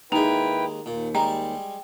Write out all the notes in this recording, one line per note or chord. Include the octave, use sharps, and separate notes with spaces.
D#2 G#3 D#4 E4 B4 G5 A#5 F7
D#2 A#2
G3 G#3 G5 A#5